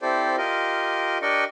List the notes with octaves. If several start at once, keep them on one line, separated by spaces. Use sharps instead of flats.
C4 E4 G4 A4 C5 D5
F4 G4 A#4 D#5
D4 G4 A#4 D5 D#5 C#6